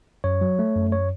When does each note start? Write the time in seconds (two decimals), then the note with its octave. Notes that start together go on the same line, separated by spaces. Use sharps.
0.24 F#2 C#5
0.41 F#3
0.59 A3
0.76 F#2
0.92 C#5